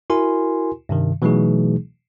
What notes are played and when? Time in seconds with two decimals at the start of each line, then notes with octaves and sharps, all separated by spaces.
0.10 E4 F#4 A#4 G#5 C6
0.89 G2 C3 D#3
1.22 B2 E3 F#3 A3 D#4 G#4